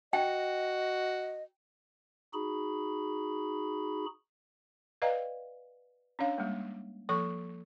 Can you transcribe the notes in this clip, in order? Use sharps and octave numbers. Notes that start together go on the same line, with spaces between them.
F#4 D#5 G5
D#4 F#4 G#4 B5
B4 D5 D#5 F5 G5 A#5
C#4 D4 C#5 F5
G3 G#3 A#3
F3 A#3 A4 C#6